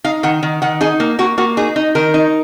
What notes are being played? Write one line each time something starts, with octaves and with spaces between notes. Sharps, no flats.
D#4 F5
D#3 F#5
D#3
D#3 F#5
D#4 G#4
A#3
A#3 F#4
A#3 F#4
D#4 G#4
D#4
D#3 A#4
D#4